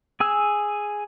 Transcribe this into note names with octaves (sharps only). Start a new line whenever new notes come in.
G#4 G#5 E6